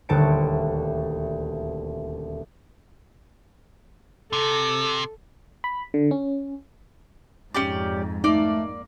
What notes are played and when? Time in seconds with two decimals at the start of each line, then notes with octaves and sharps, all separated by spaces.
0.09 D#1 D2 D3 A5 C#7 D7
4.33 C3 A4
5.64 B5
5.94 D3
6.11 C#4
7.54 F2 G#2 C#4 G4 D5
8.24 A3 A#3 D#4 D5